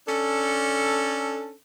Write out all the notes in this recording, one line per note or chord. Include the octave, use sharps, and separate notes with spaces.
C#4 D4 A4